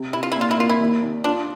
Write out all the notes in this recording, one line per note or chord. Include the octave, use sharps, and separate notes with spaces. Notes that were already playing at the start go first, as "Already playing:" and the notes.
Already playing: C3
C3 E4
F4
A#2 E4
F4
E4
A#3 F4
E4
D#2
D#2
D4 F4